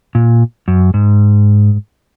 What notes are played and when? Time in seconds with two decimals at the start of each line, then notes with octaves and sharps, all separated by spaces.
0.15 A#2
0.68 F#2
0.94 G#2